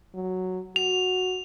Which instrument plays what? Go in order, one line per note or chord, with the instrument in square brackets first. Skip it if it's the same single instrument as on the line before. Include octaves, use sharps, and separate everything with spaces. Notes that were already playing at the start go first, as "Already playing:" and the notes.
[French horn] F#3
[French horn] F#4 [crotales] F7